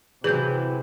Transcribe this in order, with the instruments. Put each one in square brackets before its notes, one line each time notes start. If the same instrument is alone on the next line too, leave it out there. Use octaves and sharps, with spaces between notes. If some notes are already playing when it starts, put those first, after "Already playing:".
[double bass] C3 [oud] E3 F#3 [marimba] G#4 G6